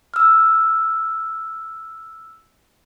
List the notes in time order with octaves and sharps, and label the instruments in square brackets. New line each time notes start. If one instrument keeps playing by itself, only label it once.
[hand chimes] E6 F6